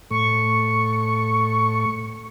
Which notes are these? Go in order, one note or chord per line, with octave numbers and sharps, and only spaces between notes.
A2 C#6